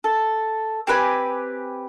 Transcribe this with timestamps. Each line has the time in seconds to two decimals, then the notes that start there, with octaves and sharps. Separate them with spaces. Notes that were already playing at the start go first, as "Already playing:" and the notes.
0.04 A4
0.87 C4 G4 B4 G#5